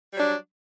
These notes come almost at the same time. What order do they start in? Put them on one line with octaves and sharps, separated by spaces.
G3 F#3 D4